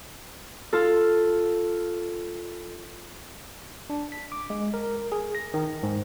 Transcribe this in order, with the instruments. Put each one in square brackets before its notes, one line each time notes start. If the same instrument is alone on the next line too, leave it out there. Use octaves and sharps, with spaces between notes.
[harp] F4 A4
[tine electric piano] D4
B6
D6
G#3
A#4
G#4
A#6
D#3
G#2